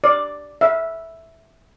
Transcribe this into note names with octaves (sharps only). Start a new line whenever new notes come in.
D5
E5